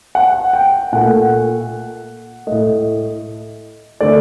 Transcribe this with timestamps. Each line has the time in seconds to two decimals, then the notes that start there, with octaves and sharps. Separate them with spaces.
0.15 F#5
0.53 G5
0.93 A#2 A3 F#5
2.47 A2 A3 D#5
4.01 D3 A3 D5